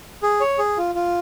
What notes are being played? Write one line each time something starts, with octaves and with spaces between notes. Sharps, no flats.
G#4
C#5
G#4
F4
F4